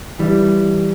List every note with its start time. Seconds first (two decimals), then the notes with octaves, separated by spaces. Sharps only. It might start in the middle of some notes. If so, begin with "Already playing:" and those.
0.19 E3 G3